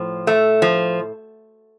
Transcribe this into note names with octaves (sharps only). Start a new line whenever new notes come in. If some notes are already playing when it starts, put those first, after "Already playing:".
Already playing: A2 F3
A3
F3